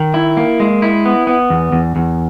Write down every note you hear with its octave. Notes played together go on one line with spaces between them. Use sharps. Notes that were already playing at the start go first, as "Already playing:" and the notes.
Already playing: D#3
E4
A#3
G#3
E4
B3
B3
E2
E2
E2